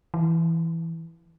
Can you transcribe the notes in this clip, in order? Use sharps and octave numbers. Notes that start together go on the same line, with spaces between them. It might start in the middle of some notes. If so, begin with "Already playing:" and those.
E3